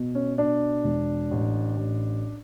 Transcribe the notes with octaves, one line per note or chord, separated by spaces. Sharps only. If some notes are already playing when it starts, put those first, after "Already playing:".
Already playing: B2
C#4
B2 D4
E1
A1
A1